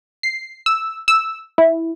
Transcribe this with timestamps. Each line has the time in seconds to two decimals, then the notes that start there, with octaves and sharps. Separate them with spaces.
0.23 C7
0.66 E6
1.08 E6
1.58 E4